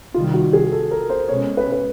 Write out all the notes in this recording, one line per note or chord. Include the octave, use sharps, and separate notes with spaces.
C3 D#3 G3 F4
F#4
G#4
A4
A#4
C5
B2 G#3 C#4 C#5
B4
B4